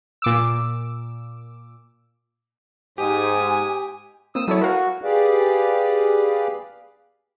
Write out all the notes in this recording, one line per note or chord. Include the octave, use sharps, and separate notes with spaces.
A#2 D6 E6
G#2 G4 G#5 D#6
A#3 C4 D#6 E6
F#3 E4 A4 C#5
F#4 A#4 F5
G4 G#4 B4 D5 F5